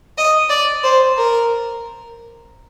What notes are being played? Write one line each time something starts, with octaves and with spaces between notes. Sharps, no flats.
D#5
D5
C5
A#4